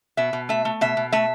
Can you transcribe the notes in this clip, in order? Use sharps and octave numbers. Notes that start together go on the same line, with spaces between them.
B2 E5
B2
A3 E5
A3
B2 E5
B2
A3 E5